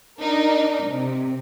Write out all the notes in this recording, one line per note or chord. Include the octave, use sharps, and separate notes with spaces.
D4 D#4 A#4
C3